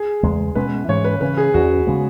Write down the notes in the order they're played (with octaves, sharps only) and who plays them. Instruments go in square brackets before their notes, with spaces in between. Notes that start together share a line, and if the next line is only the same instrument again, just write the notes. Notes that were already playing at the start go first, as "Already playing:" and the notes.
Already playing: [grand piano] G#4
[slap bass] E2 C#3 G#3
[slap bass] B2 G#3 C#4 [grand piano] B4
[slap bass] G#2 E3 G#3 C#4 [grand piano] C#5
[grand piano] B4
[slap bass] C#3 E3 C#4 [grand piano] B4
[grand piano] G#4
[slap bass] E2 E3 C#4 [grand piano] F#4
[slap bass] C#3 G#3 B3